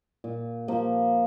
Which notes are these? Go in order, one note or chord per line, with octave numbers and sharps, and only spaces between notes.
A#2
F3 A#3